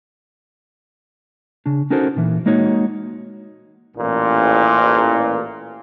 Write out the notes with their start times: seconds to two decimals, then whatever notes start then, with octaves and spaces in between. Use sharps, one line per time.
1.66 C#3 D4
1.90 C#4 D#4 F#4 A4 A#4 C5
2.16 A#2 E3
2.46 G#3 A#3 D#4 F#4 C#5
3.97 A1 A#2